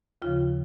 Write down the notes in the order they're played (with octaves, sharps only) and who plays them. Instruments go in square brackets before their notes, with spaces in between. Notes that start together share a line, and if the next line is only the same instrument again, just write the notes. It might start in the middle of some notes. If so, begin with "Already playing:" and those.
[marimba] D#2 C#3 F3 F4